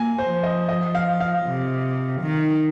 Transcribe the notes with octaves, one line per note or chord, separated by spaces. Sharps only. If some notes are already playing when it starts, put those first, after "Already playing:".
Already playing: A#3 G#5
C5
F3
D#5
D#5
F5
F5
C3
D#3